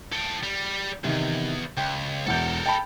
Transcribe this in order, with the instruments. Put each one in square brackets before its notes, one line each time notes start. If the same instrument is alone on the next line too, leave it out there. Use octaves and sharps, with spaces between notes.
[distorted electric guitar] A4 G5
G3
[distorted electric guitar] E2 G#2 [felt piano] C3 D#3
[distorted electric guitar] C#2 [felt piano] G5
[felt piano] E1 E2 G6 [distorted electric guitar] A4 A#4
[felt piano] G5 A5 B5